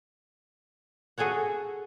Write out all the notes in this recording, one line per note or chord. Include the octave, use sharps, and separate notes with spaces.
F#4 G#4 A4 C#5 F#5